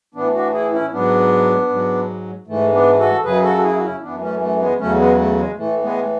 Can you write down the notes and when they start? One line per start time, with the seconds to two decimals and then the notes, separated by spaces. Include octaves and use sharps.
0.14 A2 E3 B3 D4
0.34 D4 F#4
0.54 E4 G#4
0.73 C#4 E4
0.92 G#2 F#3 B3 D4
1.69 G#2 F#3
2.47 G#2 E3 A3
2.73 B3 D4
2.99 F#4 A4
3.24 F#2 C#3 F#3 G#4 B4
3.44 F#4 A4
3.56 F#4
3.63 E4 G#4
3.77 F#4
3.83 C#4 E4
4.01 F#2 E3 B3 D4
4.21 A3 C#4
4.40 A3
4.60 G#3 B3
4.79 E2 C#3 F#3 A3 C#4
4.99 G#3 B3
5.18 A3
5.38 G#3
5.57 A2 E3 A3
5.82 G#3 B3